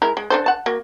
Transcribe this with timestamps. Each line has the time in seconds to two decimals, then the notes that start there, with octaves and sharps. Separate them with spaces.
0.02 G#3 E4 A#4
0.17 G#3
0.30 D4 A4 C5
0.46 F#5 A5
0.66 A#3 F#4